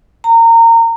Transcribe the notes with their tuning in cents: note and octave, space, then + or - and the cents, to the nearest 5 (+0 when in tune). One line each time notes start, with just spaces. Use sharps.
A#5 -25